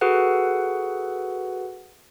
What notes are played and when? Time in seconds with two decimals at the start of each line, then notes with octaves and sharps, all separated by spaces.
0.01 F#4 G#4 A4 B4 F#5